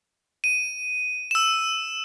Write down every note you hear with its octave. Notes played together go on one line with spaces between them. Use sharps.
D#7
E6 E7